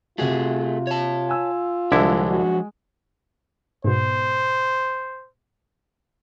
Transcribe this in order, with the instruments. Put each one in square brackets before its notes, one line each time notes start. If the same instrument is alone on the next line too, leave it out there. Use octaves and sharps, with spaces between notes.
[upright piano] C3 F#4 [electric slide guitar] A3 G#4 [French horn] F4
[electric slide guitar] C#5 A5
[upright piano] G#5 E6
[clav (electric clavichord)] C2 D3 E4 [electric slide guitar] F3 F#3 D4 [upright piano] G#3
[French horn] F#4
[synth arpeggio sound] G#2 B2 [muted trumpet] C5